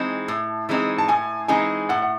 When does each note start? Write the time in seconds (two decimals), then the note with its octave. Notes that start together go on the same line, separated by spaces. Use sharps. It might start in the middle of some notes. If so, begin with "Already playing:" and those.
Already playing: E3 G#3 C4 D#4
0.28 A2
0.69 E3 G#3 C4 D#4
0.98 A5
1.08 A2 G#5
1.48 E3 G#3 C4 D#4 G#5
1.89 A2 F#5
2.02 F#5